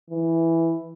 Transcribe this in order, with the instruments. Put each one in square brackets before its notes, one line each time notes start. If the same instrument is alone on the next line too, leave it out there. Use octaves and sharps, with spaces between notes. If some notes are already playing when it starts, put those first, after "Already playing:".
[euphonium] E3